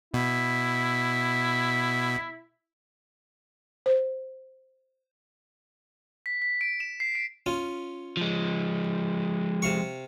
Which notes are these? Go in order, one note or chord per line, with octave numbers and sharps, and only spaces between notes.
B2 E4
C5
B6
B6
D7
E7
C7
D7
C#4 F4
F3 G#3
C3 F5 C#6